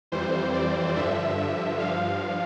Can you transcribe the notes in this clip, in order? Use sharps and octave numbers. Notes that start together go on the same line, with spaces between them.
F2 E3 G3 C5
D5
G2 D3 F3 E5
E5
G2 F3 F5